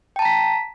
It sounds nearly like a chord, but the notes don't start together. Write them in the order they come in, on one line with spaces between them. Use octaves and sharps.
G5 A5 A#5 B6